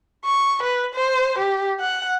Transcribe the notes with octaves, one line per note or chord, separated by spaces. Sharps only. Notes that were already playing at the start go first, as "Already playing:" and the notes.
C#6
B4
C5
G4
F#5